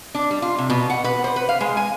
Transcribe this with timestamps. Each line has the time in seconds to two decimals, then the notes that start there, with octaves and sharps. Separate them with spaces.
0.15 D4
0.31 G3
0.42 F4
0.58 C3
0.70 B2
0.90 F#5
1.04 B4
1.24 C5
1.36 B4
1.49 F5
1.61 G#3
1.77 G#5